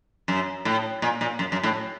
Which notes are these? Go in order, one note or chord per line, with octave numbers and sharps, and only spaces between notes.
F#2
A2
A#2
A#2
F#2
F#2
A2